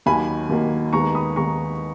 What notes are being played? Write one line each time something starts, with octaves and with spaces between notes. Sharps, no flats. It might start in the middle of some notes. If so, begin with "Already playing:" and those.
D#2 D#3 F#3 A#3 G#5 B5
D#2 D#3 F#3 A#3
D#2 D#3 G#3 B3 A#5 C#6
B5 D#6
D#2 D#3 G#3 B3 A#5 C#6